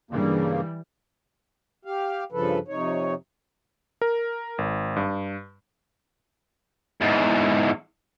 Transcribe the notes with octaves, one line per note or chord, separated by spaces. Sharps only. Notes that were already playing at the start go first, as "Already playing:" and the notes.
G2 C#3 E3 G3 A#3
G4 F5
G2 C#3 F3 A4 B4
F2 C3 D#4 C#5
A#4
G#1
G2
E2 G#2